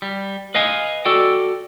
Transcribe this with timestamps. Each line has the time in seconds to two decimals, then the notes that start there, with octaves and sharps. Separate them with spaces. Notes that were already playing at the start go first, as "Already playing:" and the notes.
0.02 G3
0.55 B4 D#5 F5 G#5
1.05 F#4 A4 D5 G5